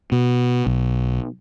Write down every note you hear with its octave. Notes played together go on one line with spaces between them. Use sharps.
B2
B1